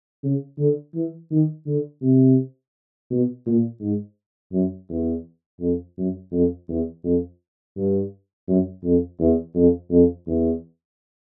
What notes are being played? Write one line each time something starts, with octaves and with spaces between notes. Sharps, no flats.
C#3
D3
E3
D#3
D3
C3
B2
A#2
G#2
F#2
E2
F2
F#2
F2
E2
F2
G2
F#2
F2
E2
F2
F2
E2